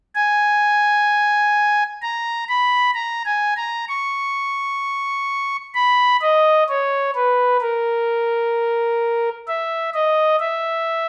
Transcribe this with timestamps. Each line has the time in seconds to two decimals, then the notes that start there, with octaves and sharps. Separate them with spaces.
0.15 G#5
2.02 A#5
2.49 B5
2.95 A#5
3.25 G#5
3.57 A#5
3.88 C#6
5.75 B5
6.21 D#5
6.68 C#5
7.15 B4
7.61 A#4
9.48 E5
9.94 D#5
10.40 E5